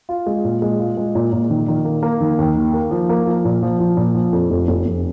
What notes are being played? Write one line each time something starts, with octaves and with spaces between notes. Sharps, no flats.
F4
G#3
A#2
G#3
F4
G#3
A#2
A#2
D#3
D#3
A#3
A#3
D#3
D#2
D#3
A#3
F3
A#3
F3
A#2
F3
F3
A#2
F3
F2
F1
F1
F1